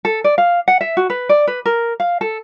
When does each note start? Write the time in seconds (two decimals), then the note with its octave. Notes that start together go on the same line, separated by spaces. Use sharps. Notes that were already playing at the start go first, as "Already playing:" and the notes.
0.05 A4
0.24 D5
0.38 F5
0.68 F#5
0.81 E5
0.97 F#4
1.10 B4
1.29 D5
1.47 B4
1.66 A#4
2.00 F5
2.21 A4